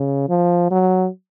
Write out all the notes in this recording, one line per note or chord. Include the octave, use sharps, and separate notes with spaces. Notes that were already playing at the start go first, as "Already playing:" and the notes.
Already playing: C#3
F3
F#3